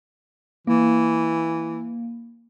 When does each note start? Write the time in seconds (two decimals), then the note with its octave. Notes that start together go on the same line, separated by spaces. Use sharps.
0.67 E3 A#3